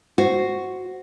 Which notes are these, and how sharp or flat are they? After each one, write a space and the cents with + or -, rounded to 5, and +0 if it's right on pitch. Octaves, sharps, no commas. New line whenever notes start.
F#4 +0 C5 +0